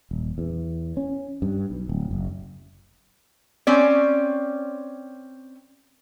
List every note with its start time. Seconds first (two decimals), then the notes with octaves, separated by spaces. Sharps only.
0.11 D#1
0.38 E2
0.97 C#4
1.42 G2
1.70 B1
1.89 D1
2.11 F#1
3.67 C4 C#4 D5